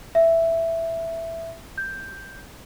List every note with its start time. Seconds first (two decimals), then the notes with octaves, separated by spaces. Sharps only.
0.15 E5
1.78 G6